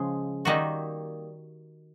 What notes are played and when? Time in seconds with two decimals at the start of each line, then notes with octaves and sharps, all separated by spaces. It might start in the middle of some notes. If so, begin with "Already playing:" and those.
Already playing: C#3 F3 G#3
0.45 D#3 G3 A#3 D#4 F#4